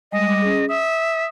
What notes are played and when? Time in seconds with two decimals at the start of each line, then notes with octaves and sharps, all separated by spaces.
0.12 G3 G#3 D#5
0.27 G3 D6
0.42 C#4 G#4
0.69 E5 D#6